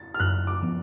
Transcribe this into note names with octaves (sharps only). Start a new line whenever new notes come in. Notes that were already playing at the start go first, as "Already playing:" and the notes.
Already playing: A6
F6
F#2 F#6
D6
F3 B3